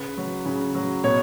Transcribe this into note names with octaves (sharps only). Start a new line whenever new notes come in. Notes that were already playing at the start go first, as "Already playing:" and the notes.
Already playing: C#3 B4
F#3
C#3
F#3
B2 C#5